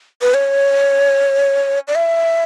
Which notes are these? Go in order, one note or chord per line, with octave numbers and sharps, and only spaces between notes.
B4
C#5
D5
E5